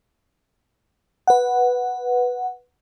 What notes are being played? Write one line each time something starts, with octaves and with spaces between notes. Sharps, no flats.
B4 F#5